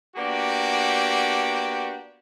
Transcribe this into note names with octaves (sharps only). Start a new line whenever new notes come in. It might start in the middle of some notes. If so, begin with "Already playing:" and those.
A#3 B3 D4 F#4 G4